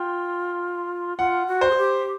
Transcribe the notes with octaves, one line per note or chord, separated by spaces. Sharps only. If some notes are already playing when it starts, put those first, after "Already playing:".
Already playing: F4 G5
F4 F#5
F#4
C5
G#4
G4